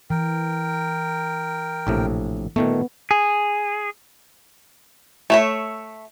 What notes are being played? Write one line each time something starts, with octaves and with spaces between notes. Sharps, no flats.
E3 A#4 G5
A#1 A2 C3
A#2 D#3 A3 B3
G#4
A3 C#5 E5